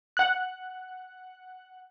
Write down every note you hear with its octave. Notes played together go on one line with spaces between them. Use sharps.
F#5 F#6